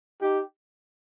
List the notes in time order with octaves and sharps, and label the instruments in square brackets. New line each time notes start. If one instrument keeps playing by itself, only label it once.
[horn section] D#4 G4